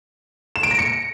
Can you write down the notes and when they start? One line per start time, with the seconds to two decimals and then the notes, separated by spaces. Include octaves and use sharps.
0.56 E7
0.63 D7
0.71 A#6
0.79 C#7